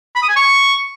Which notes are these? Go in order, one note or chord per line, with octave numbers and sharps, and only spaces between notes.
B5
D#6
G#5
C#6